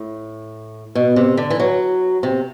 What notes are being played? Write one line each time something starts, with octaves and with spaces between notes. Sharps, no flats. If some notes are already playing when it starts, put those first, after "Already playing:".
Already playing: A2
B2
C3
D3
E3
F#3
C3